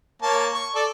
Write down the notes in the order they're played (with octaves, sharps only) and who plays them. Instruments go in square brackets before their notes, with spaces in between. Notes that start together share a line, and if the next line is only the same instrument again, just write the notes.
[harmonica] A#3 C#5 A5
C#6
A4 D5